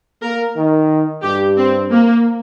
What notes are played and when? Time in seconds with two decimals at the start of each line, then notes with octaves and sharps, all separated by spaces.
0.22 A#3 A#4
0.56 D#3
1.23 G2 G4
1.57 C4
1.91 A#3